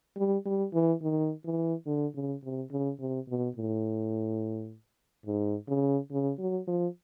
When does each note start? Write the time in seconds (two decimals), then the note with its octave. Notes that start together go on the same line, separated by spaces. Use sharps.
0.17 G3
0.45 G3
0.73 E3
1.02 D#3
1.44 E3
1.86 D3
2.15 C#3
2.43 C3
2.71 C#3
2.99 C3
3.28 B2
3.56 A2
5.26 G#2
5.68 C#3
6.11 C#3
6.39 F#3
6.67 F3